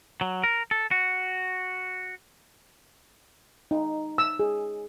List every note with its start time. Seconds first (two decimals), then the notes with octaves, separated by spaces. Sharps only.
0.21 F#3
0.44 A#4
0.71 A4
0.91 F#4
3.71 D#4
4.18 E6
4.39 G#4